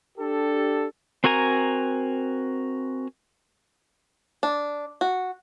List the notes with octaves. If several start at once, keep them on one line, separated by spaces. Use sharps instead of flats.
D4 G4 A4
C4 F#4 A#4 G#5 A#5
D4
F#4